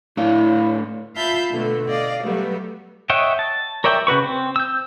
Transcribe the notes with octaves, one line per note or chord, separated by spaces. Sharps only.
A2 A3 D4 E4 C#5 D5 F5
F4 E5 F5 A5 B5 G6
B2 D3 A3 B3
D5 D#5 F5
F#3 G3 A3 B3
C#5 D#5 E5 F#5 G5
A5
A#4 C#5 D5 E5 G5
C#3 F#4 B4 C#6
C4
E6 G6